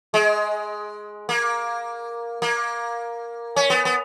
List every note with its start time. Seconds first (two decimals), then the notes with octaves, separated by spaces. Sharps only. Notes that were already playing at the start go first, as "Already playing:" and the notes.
0.14 G#3
1.29 A#3
2.42 A#3
3.56 C#4
3.70 B3
3.85 B3